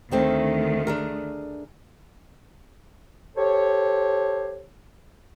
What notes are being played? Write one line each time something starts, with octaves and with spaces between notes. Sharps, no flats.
D2 D#3 A3 C4 D#4
D4 G#4 A#4
G4 A4 C5 C#5